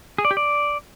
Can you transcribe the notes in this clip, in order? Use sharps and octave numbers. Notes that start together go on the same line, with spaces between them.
G#4
D5
G4
D5